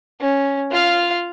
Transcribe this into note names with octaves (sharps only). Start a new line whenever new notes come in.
C#4
F4 F5